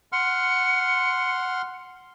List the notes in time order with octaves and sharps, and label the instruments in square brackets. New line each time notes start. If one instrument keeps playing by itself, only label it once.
[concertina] F#5 C6 F6 [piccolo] C#7